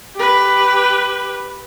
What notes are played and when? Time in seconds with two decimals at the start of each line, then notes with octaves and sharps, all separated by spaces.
0.15 G4 B4